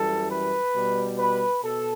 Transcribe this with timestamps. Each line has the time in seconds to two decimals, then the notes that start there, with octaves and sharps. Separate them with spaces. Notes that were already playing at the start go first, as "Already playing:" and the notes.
Already playing: F#2 E3 G3 A4
0.31 B4
0.75 B2 G3
1.18 B4
1.63 B2 A4